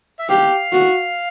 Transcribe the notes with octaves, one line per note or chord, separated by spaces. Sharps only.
E5
G4 F5
F#4